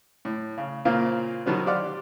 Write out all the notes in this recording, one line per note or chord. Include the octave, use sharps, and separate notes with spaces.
A2
C#3
A#2 C#3 A#3 C4 F4
B2 D#3 F#3 B3 C4
G4 C5 D5 F5 F#5